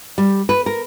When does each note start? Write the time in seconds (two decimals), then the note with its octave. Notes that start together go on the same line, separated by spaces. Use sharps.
0.18 G3
0.49 B4
0.66 A#4